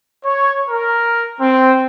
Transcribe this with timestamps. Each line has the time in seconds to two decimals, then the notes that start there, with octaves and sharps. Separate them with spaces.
0.24 C#5
0.70 A#4
1.40 C4